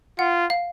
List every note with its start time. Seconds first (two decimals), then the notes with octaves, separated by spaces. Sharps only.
0.19 F4 F#5
0.50 F5